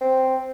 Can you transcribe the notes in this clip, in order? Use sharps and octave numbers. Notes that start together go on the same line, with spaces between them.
C4